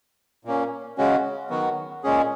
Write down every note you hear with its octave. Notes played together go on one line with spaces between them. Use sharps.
A#2 A#3 C#4
C#3 G#3 C#4 F#4
D#3 F#3 B3 F#4
A#2 G#3 C#4 G#4